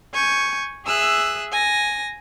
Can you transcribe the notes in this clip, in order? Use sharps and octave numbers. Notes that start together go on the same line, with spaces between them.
G#5 C#6 G6
G#4 E5 E6 F#6
G#5 A#6